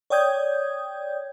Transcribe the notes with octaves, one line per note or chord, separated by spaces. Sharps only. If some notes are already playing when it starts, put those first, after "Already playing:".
C#5 D5 G5 D#6 G6 G#6